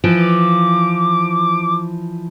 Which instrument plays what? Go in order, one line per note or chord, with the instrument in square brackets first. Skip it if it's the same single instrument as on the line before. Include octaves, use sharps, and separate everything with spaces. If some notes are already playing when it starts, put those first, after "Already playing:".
[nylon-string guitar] E3 F3 [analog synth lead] D6